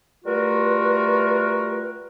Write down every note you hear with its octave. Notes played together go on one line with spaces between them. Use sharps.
G3 A3 F4 F#4 A#4 B4